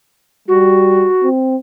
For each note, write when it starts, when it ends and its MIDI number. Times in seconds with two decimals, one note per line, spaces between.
0.48 1.07 55
0.48 1.28 66
1.24 1.56 60